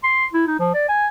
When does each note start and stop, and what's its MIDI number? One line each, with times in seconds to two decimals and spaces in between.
0.04 0.26 84
0.33 0.45 64
0.47 0.58 63
0.60 0.71 53
0.74 0.88 74
0.89 1.08 80